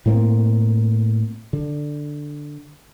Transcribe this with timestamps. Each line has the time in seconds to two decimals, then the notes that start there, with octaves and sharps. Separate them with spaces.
0.06 A2 A3 A#3 C4
1.53 D3